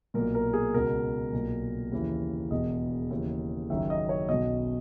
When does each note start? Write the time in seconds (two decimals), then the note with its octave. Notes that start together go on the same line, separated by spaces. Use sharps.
0.14 B1 A#2 A#4
0.35 A#4
0.53 G#4
0.74 C#2 B2 A#4
1.32 B1 A#2
1.92 D#2 C#3 E3
2.51 E1 E2 B2 D#5
3.10 D#2 C#3 E3
3.70 F#1 F#2 D#3 E5
3.90 D#5
4.09 C#5
4.29 B1 B2 D#5